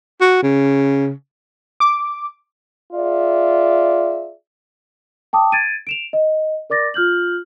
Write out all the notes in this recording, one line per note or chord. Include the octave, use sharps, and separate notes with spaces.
F#4
C#3
D6
F4 G#4 D5 E5
G5 A5 D6 D#6
G#6 A6 D7 D#7
D7 E7 F7
D#5
A#4 D5 D6 A6 A#6
F4 F6 G6 F#7